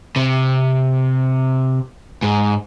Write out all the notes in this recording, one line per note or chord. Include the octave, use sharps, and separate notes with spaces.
C3
G#2